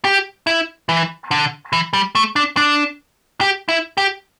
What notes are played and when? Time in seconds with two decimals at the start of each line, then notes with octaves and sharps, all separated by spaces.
0.05 G4
0.47 E4
0.89 E3
1.31 D3
1.73 E3
1.93 G3
2.15 A3
2.36 D4
2.57 D4
3.41 G4
3.69 E4
3.97 G4